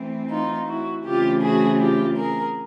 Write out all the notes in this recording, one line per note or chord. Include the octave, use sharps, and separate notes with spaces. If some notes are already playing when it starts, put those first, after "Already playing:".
Already playing: E3 A3 C4
D#4 F4
E4 F#4
C#3 E3 A3 C4 F4 G4
F#4 G#4
F4 G4
G#4 A#4